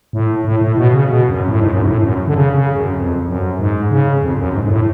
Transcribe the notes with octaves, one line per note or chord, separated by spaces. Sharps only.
A2
A2
A2
B2
C#3
B2
F#2
A2
G#2
F#2
G#2
A2
F#2
D3
C#3
C#3
F#2
F2
F#2
G#2
C#3
F2
F#2
G#2
G#2
A2